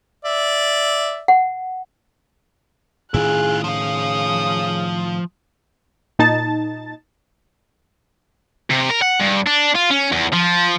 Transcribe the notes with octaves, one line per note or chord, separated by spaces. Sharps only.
D5 E5
F#5
A2 D#3 C#4 E4 F4 G#4 F#6
C#3 F3 F5 D#6
A#2 D#4 A5 A6
C3
A#4
F#5
G2
D4
F4
C#4
E2
F3